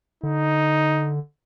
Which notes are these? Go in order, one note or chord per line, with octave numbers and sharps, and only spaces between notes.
D3 D#4